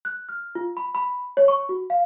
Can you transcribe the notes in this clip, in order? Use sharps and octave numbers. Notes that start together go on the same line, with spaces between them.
F#6
F6
F4
B5
B5
C#5
C#6
F#4
F5